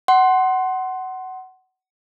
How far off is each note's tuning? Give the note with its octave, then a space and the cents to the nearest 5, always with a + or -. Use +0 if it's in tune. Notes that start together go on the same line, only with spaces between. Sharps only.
F#5 +15 C6 +5